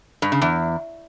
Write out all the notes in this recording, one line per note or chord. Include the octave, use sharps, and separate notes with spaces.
G2
C#3
E2